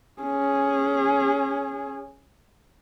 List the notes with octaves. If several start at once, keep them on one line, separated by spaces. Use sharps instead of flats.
C#4 G#4